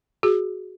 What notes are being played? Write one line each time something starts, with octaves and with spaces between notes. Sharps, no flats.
F#4 G#4